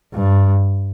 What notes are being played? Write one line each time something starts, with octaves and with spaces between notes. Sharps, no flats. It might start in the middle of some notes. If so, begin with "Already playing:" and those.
G2